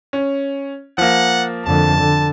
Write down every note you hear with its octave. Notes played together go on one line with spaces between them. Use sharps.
C#4
F3 A#3 F#5
F2 D3 A5
D3